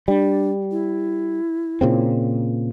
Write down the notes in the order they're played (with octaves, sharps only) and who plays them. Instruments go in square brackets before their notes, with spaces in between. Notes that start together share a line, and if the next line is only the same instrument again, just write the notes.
[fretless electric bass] G3 [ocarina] D4
[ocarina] E4
[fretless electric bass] A#2 C#3 C4